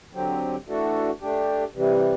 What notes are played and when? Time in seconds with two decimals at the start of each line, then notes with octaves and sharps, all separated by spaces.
0.13 D3 F#3 C4 G4
0.67 E3 A3 D4 F#4 A4
1.21 A3 D4 G4
1.75 C3 E3 G3